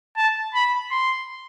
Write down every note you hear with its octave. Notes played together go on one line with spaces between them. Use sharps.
A5
B5
C6